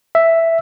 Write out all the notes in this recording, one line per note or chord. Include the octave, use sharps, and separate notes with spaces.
E5